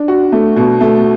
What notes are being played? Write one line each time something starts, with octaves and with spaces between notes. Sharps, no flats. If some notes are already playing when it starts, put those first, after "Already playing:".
Already playing: D4
F#4
A3
B2
A3